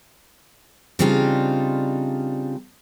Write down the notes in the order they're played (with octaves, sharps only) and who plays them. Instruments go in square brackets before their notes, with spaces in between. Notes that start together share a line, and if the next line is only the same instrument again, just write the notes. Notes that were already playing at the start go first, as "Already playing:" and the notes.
[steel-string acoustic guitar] C#3 G3 C4 D4 D#4 F4